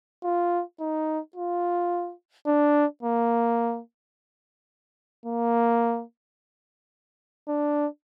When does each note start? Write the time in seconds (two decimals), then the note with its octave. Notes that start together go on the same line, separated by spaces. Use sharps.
0.24 F4
0.80 D#4
1.36 F4
2.46 D4
3.03 A#3
5.26 A#3
7.48 D4